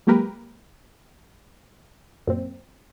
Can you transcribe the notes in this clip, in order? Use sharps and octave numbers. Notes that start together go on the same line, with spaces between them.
F#3 G#3 A#3 G4 A#4 B4
F#2 A#2 C4